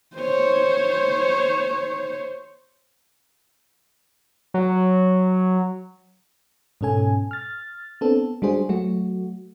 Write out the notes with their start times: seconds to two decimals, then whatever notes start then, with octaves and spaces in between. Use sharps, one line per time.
0.16 C5 C#5
4.54 F#3
6.81 G#2 B2 C#4 A4 G#5
7.31 F6 A6
8.01 B3 C4 D4 A4
8.42 G3 G#3 D4 F#4 G#4 C5
8.69 F#3 A3 F#4